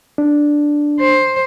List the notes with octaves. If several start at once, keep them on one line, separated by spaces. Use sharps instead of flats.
D4
C5